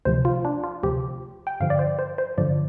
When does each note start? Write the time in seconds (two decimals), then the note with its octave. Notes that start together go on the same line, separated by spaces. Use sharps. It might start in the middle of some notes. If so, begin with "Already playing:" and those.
0.05 D2 C3 F3 C5
0.25 F4
0.45 D4
0.64 F4
0.83 D2 C3 F3 G4
1.47 G5
1.60 G2 D3 F3 F5
1.70 D5
1.79 C5
1.99 C5
2.18 C5
2.38 G2 D3 F3 D5